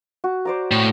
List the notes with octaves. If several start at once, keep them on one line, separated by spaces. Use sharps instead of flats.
F#4
C5 D5 A#5
A2